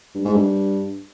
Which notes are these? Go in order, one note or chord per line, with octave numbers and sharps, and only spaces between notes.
G2
G#2
G2